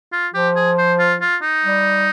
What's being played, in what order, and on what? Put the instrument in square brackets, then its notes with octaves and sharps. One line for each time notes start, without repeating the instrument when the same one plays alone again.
[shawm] F4
[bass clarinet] F3 [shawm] G4
[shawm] G#4
C5
F4
F4
D#4
[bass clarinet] G3